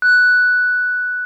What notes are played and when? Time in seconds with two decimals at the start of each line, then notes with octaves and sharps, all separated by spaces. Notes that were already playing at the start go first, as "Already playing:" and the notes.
0.02 F#6